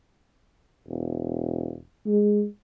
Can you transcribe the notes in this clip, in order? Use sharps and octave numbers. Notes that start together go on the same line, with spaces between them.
E1
G#3